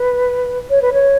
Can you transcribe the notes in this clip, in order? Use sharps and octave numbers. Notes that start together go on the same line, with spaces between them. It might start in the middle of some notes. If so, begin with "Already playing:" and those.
Already playing: B4
C#5
B4
C#5